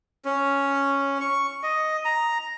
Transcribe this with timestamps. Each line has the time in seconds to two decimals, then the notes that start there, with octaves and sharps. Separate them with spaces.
0.25 C#4
1.21 C#6
1.63 D#5
2.05 A#5